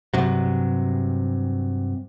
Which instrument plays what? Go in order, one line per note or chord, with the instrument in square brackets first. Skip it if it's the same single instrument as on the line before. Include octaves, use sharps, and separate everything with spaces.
[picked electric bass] G2 C3 F#3